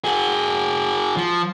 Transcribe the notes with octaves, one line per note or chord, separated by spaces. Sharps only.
F#4 G#4
F3